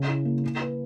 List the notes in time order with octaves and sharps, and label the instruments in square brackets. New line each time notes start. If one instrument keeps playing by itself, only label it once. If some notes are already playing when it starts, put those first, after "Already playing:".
Already playing: [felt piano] C#3
E4
A#3
A#3
B4